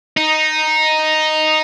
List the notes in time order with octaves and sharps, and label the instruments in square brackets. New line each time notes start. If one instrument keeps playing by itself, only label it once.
[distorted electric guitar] D#4